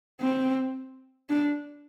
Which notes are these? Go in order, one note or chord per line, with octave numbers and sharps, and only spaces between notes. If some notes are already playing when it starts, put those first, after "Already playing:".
C4
D4